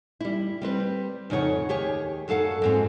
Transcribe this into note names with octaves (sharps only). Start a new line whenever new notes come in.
G3 E4
G3 C4 B4
F2 C#3 D#4 C#5 F#5
D#2 G4 G#4 C#5
F#2 F#3 A4 F5 F#5
F2 G#2 C4